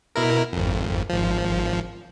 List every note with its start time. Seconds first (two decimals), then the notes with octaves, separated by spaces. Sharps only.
0.16 B2 E4 A#4
0.53 G#1 F2
1.10 G#1 F3